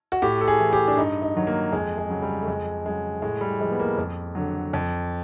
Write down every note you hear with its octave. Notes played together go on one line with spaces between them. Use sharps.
F#4
A2 G4
A4
G#4
E3
G4
D4
G2 D#4
D#4
D#3 F#3
A#3
F2 G#3
G#3
C#3 F#3
G3
A3
F2 G#3
C#3 F#3 G#3
A2 G#3
G3
F3 G#3
B3
A#3
F2
D3 F#3
F2